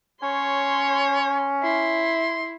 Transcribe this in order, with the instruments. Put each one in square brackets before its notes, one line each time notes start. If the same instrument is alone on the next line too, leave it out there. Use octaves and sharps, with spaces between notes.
[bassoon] C#4 [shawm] C#5 [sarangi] C6
[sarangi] E4 [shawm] C6